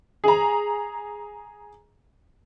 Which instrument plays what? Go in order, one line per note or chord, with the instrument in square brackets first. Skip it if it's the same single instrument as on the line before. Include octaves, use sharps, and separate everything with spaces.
[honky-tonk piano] G#4 A#5